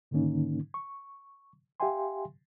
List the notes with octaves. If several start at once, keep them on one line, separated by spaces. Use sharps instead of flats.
G#2 D3 D#3 A#3 C#4 D#4
C#6
G4 E5 F5 G5 G#5 C6